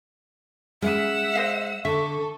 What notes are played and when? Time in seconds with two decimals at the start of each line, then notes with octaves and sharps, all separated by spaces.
0.82 G#3 C#4 E5 F#5 E6
1.35 C5 D#5 F5
1.85 D3 A4 E5 C#6